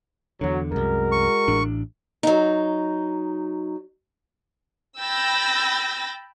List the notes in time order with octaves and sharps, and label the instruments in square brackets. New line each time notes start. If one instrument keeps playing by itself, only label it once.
[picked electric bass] E2 D3 [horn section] F#3
[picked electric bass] C2 F#2 [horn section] G#3 F#4 A#4
[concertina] C#6
[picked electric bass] A1 A2 D4
[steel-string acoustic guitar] F#3 D#4
[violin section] G5 B5 E6 G6 A6 A#6